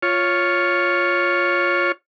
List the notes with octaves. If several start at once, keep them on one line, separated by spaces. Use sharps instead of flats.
F4 C#5